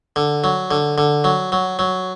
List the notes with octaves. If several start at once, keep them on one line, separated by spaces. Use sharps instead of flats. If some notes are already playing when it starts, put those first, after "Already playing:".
D3
F#3
D3
D3
F#3
F#3
F#3